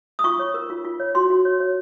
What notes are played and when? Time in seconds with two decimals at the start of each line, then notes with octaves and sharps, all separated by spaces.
0.19 D#6
0.24 F4 C#6
0.39 C#5
0.54 A#4
0.70 F4
0.84 F4
1.00 C#5
1.15 F#4 C6
1.30 F#4
1.45 C#5
1.60 C#5